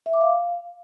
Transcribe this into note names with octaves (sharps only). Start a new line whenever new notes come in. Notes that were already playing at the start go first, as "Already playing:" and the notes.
E5
D6
F5